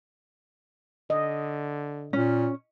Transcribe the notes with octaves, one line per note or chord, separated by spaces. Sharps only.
D3 D#5
A#2 C#4